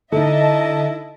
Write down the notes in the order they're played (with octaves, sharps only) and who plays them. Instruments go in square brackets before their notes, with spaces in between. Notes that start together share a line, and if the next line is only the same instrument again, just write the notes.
[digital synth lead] D3 [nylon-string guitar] D#4 A4 [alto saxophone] E4 [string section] D#5 E5 A5